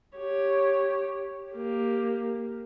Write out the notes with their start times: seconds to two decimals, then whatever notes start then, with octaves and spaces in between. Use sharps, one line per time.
0.17 G4 C#5
1.52 A#3 G4